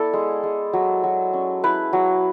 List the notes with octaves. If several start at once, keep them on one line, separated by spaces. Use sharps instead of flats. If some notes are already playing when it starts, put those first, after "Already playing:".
Already playing: B3 E4 A4 D5
G#3
G#3
F#3
F#3
C#4
E4 B4
F#3